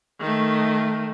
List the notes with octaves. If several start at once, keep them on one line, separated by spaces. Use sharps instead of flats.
D#3 A3